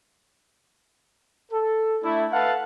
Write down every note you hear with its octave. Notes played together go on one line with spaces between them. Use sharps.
A4
A3 D4 E4
A4 B4 F5 F#5 A5